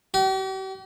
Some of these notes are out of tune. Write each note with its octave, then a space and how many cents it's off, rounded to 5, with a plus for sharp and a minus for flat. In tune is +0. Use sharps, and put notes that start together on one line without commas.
G4 -45